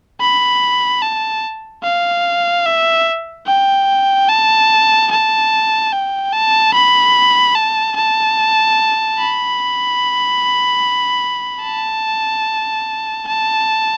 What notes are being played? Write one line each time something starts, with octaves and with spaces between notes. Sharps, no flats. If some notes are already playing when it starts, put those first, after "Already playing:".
B5
A5
F5
E5
G5
A5
A5
G5
A5
B5
A5
A5
B5
A5
A5